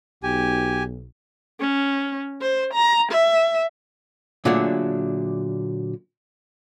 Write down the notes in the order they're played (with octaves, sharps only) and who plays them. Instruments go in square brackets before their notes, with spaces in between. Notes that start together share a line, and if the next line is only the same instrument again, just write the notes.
[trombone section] B1 [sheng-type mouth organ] G4 G#5
[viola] C#4
C5
A#5
E5
[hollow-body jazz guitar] A#2 D3 F#3 A3 D4 G#4